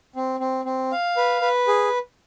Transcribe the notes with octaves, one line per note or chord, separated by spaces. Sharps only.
C4
C4
C4
F5
B4
B4
G#4